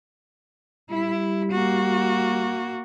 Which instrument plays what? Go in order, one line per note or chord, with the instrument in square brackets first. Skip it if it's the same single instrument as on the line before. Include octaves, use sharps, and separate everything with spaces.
[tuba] G3 [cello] E4
[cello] A#3 F#4